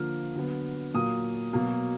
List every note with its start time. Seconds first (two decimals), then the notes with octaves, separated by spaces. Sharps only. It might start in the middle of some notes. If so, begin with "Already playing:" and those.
Already playing: D3 F3 A#3 F6
0.36 D3 F#3 B3
0.94 A#2 F#3 A#3 D#6
1.53 B2 F#3 A#3